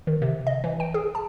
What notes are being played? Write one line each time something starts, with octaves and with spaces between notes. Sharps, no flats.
D#3
C3
D#5
E3
G5
G#4
A5